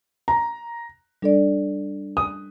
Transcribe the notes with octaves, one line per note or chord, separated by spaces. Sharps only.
A#5
G3 D4 A4 D5
D#6